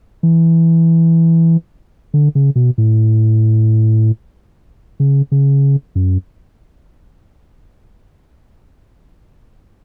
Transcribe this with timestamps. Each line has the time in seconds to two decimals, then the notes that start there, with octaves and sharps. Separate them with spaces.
0.23 E3
2.14 D3
2.35 C#3
2.56 B2
2.78 A2
5.00 C#3
5.32 C#3
5.95 F#2